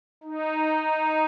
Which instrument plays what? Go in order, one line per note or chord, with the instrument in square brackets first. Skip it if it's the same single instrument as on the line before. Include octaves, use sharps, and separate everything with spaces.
[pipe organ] D#4